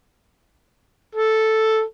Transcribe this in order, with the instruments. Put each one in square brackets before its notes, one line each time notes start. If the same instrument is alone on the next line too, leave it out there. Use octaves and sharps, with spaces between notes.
[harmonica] A4